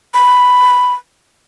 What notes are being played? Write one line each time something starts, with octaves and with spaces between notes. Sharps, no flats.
B5